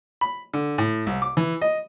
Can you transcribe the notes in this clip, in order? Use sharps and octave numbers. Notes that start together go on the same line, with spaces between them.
B5
D3
A2
C2
D6
E3
D#5